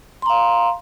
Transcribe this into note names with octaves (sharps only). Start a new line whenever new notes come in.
F5 A#5 C6